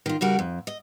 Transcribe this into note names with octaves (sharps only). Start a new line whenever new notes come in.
D#3 F4
C#3 G3 F#4 A#4
F2
D#5